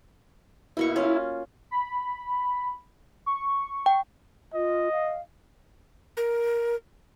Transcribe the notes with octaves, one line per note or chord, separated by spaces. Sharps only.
B2 A#3 E4 C#6
C#4 F4 F5
B5
C#6
G5
F4 D#5
F5
A#4